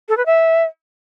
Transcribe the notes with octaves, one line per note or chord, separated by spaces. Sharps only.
A4
B4
E5